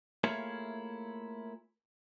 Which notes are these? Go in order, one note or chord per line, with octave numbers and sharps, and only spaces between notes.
A3 A#3 E4 F4 G#4 C#5